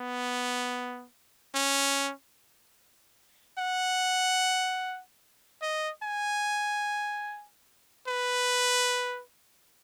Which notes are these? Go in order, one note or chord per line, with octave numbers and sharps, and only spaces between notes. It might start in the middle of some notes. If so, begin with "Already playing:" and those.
Already playing: B3
C#4
F#5
D#5
G#5
B4